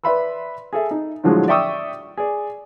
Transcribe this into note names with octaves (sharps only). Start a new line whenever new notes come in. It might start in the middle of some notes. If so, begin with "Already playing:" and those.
B4 D5 E5 B5 C6 E6
G#4 A4 E5
D#4
A2 D3 F3 F#3 G#3
D5 E5 G5 C#6 D#6 E6
G#4 D5